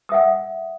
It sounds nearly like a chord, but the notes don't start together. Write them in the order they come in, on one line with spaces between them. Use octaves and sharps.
D#6 E5 F#5